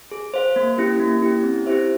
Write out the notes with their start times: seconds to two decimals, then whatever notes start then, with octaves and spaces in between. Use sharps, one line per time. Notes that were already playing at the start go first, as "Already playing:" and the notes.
0.11 G#4
0.34 C5 F5
0.56 A#3
0.78 C#4 E4 G4
1.00 A#3
1.22 C#4 E4 G4
1.43 C4
1.66 E4 G4 C5 E5